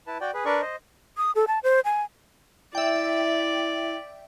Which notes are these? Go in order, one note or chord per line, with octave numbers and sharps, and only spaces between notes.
E4 B4 A5
F#4 D5 G5
G#4 B4
D4 A#4 B4 D5 C#6
C5 D#5
D#6
A4
A5
C5
G#5
E4 D5 E5 G5